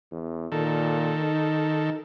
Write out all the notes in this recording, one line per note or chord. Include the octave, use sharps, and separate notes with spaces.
E2
A#2 D#3 A4
D#4